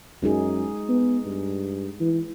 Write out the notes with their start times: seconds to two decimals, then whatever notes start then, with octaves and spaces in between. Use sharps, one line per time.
0.22 F#2 G#3 D#4 G#4
0.89 B3
1.26 G2
2.01 E3